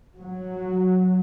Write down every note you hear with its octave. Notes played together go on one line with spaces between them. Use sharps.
F#3